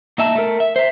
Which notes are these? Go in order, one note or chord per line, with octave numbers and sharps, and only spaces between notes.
A#2 D#4 E5 A5
A3 A#4
E5
C5 E5